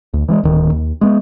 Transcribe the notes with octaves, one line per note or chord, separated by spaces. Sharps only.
D2
E3 G3 G#3
D1 D#3
D#2
G#3 A#3 B3